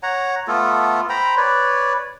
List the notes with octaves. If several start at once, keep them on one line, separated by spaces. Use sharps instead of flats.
C#5 F#5 A#5
A3 B3 F4 A4
C5 G5 A#5 B5
B4 C#5 D5